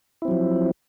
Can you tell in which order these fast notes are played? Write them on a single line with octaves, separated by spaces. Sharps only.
E4 C4 F#3 F3